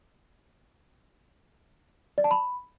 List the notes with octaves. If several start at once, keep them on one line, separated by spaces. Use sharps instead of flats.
D5
A5
B5